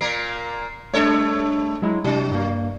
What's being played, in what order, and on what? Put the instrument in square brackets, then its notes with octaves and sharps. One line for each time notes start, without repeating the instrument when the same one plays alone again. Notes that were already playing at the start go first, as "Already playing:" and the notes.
[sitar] A#2 A#3 A#4 [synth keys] C7
[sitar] G3 A4 C#5 [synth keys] A3 D4
[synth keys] F#3 G#3 E4
[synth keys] C3 D4 [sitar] F#3
[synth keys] G2 A#3